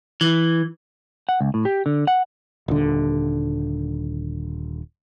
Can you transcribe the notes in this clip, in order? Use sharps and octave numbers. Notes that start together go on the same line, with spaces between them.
E3
F#5
C#2
A2
G4
D3
F#5
D#1 D3